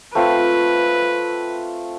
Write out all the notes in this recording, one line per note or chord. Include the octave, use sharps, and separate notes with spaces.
A3 C4 F4 B4